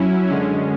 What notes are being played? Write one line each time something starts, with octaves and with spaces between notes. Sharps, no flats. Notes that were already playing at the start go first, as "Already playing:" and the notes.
Already playing: F#3 C#4 E4
F#2 D3 G#3 C#4